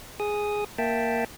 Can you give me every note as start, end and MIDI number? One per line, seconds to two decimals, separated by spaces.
0.20 0.64 68
0.20 0.64 87
0.78 1.25 58
0.78 1.25 76
0.78 1.25 79
0.78 1.25 81